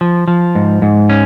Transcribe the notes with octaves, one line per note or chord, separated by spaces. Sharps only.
F3
F3
G#2
G#2
C#4